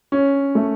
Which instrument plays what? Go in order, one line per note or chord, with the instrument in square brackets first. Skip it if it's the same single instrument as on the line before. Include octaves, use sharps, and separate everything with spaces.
[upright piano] C#4
A3